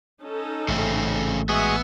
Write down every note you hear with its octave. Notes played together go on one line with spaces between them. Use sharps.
C#4 D#4 A4
A1 G#2 C#3 A3 C4
G#3 B3 F#4 G#4 E5